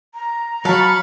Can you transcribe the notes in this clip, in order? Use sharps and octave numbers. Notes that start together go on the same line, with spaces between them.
A#5
F#3 F5 A5 B5 C#6 A6